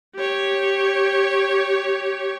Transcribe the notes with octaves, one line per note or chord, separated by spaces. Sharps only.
G4 C#5